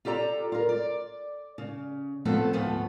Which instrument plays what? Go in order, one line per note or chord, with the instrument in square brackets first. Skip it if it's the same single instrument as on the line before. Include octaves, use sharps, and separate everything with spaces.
[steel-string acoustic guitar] F4 G4 A4 D5 A#5
F4 A#4
D5
C#3
F3 A3 B3 C4 A4
D2 G#2 F3 A3 B3